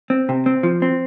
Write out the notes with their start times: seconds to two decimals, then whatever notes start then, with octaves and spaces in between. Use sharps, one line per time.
0.10 C4
0.29 C3
0.46 C4
0.63 F3
0.82 C4